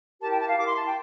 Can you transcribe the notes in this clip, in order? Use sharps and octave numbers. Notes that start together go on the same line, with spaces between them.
E4 G4 A#4 A5
G5
A5
F5
E4 G4 A#4 D6
C6
A5
G5